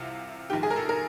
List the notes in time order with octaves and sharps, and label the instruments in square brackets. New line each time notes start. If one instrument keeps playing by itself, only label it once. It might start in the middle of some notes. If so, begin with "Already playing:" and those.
Already playing: [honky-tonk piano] C2 C3 E3 F4
A#1 G#2 D#3 G4
G#4
A#4
A4
A#4